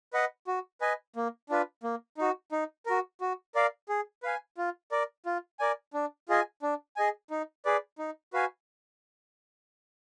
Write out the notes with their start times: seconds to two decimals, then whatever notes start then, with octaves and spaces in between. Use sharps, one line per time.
0.13 B4 D#5 F#5
0.47 F#4
0.81 B4 D#5 G#5
1.16 A#3
1.49 D4 F4 B4
1.83 A#3
2.18 D#4 F#4
2.52 D#4
2.86 F#4 A#4
3.21 F#4
3.55 A#4 D5 F5
3.89 G#4
4.23 B4 F5 G#5
4.58 F4
4.92 A#4 D5
5.26 F4
5.59 A#4 D5 G#5
5.94 D4
6.29 F4 G#4 D#5 G#5
6.62 D4
6.96 G#4 D#5 G#5
7.30 D#4
7.65 G#4 B4 D5
7.98 D#4
8.33 F#4 B4 F5 G#5